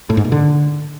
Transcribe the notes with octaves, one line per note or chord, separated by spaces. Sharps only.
A2
G#2
A#2
D3